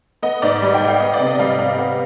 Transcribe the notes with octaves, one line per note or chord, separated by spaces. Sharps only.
B3 D#5
G#2 D5
G3 D#5
G5
G#2
F5
B3 D#5
D5
C3
D#5
G3 F5
C3
B3